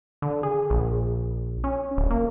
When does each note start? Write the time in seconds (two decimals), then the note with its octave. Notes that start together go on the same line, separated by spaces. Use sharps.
0.22 D3
0.43 G#4
0.70 A#1
1.64 C#4
1.97 D1
2.11 A#3